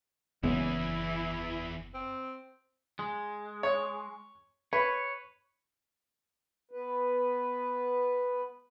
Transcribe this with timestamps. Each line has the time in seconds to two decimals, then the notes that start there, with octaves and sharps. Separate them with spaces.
0.44 F#1 E2 C#3 E3 G#3 B3 E4
1.94 C4
2.99 G#3
3.63 C#5
4.73 B4 C#5
6.71 B3 B4